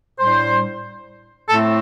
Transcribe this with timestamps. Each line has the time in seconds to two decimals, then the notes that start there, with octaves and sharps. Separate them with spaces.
0.19 A2 G3 D4 C5
1.49 A2 A3 C4 A4